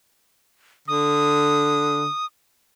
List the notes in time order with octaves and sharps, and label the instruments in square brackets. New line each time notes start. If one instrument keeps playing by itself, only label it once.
[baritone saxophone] D3 [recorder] D#6